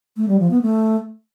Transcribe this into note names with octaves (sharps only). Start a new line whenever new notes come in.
A3
G3
F3
B3
A3